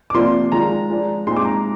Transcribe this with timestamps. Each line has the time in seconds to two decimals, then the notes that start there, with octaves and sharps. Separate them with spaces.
0.10 D6
0.14 C3 F3 A#3 D4 F4 C6
0.52 D#3 G#3 D4 F4 A#5
0.89 F3 G#3 D4
1.27 A#2 G#3 C4 D#4 C6
1.37 D6
1.45 A#5